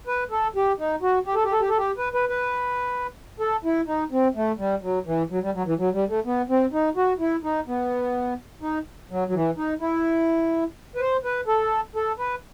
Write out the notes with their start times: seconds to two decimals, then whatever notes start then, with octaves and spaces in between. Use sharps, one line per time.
0.07 B4
0.31 A4
0.56 G4
0.79 D#4
1.02 F#4
1.26 G4
1.35 A4
1.44 G4
1.52 A4
1.61 G4
1.69 A4
1.77 G4
1.98 B4
2.14 B4
2.29 B4
3.40 A4
3.65 E4
3.87 D#4
4.11 C4
4.35 A3
4.58 G3
4.82 F#3
5.06 E3
5.31 F#3
5.42 G3
5.54 F#3
5.66 E3
5.78 F#3
5.93 G3
6.09 A3
6.25 B3
6.49 C4
6.73 D#4
6.96 F#4
7.20 E4
7.44 D#4
7.67 B3
8.62 D#4
9.11 F#3
9.28 F#3
9.34 E3
9.57 D#4
9.81 E4
10.96 B4
11.00 C5
11.24 B4
11.47 A4
11.96 A4
12.19 B4